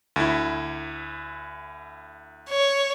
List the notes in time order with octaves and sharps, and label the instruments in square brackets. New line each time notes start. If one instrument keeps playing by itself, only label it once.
[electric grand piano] D2 E4
[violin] C#5